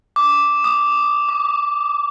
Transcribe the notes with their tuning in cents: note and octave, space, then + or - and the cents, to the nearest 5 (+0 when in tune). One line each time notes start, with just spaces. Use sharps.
D6 -5
D#6 -25
D6 -40